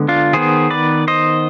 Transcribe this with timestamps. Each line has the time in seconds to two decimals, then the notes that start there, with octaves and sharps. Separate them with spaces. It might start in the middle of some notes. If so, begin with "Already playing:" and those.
Already playing: D3 G#3 B3
0.08 D4 F4
0.33 D#3 B3 G#4 C5
0.70 B4 D5
1.08 C5 D#5